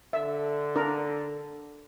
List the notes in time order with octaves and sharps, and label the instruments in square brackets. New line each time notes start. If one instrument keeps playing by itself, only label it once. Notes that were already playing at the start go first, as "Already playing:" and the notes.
[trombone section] D3 A4 [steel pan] E5
[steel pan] D4 A#4